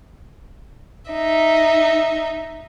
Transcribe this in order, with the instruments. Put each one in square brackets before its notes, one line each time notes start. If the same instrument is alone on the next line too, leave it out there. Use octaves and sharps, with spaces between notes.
[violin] D#4 E5